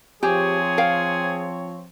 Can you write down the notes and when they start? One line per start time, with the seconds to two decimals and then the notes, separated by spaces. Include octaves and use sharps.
0.23 F3 C4 G4 G#4 C#5 G#5
0.78 F5 G5